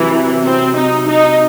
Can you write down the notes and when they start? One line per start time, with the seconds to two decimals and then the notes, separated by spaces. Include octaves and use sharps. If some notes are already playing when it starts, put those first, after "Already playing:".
Already playing: C3 E3 F#3
0.46 C4
0.77 D#4
1.07 D#4